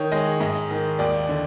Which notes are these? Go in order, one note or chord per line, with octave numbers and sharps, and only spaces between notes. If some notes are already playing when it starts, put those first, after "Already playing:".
Already playing: D#3 C#5
G#3 D#5
G#2 D#5
D#3
D#2 D5
D3